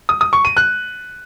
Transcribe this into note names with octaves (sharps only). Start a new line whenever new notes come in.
D#6
D#6
C#6
D#7
F#6